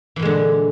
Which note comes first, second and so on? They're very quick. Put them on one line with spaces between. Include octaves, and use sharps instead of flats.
E3 A#2 G#3 D3